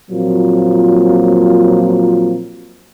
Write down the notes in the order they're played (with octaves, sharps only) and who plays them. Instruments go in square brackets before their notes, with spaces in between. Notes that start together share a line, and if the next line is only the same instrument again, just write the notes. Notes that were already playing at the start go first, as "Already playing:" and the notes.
[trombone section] A#2 F3 F#3 A#3 C4 F4